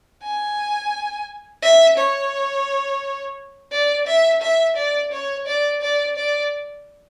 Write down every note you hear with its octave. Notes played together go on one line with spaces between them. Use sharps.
G#5
E5
C#5
D5
E5
E5
D5
C#5
D5
D5
D5